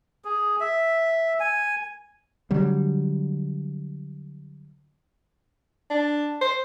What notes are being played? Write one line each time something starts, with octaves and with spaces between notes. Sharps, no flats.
G#4
E5
G#5
D3 F#3 G3
D4
C5